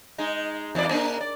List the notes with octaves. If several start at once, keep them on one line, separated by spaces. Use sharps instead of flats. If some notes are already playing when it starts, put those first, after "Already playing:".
G#3 D#4
E2 E3 D5
A#3 D4 A#4
D5